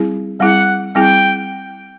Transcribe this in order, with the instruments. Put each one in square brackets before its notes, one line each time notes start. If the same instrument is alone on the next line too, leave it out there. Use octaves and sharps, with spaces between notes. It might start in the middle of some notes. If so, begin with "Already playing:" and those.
Already playing: [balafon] G3 C4 E4 G#4
[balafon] G3 C4 E4 G#4 [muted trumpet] F#5
[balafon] G3 C4 E4 G#4 [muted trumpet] G5